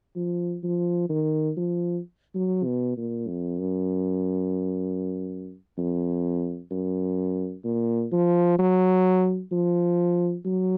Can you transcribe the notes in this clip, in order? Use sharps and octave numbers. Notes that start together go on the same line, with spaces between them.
F3
F3
D#3
F3
F#3
B2
A#2
F2
F#2
F2
F#2
A#2
F3
F#3
F3
F#3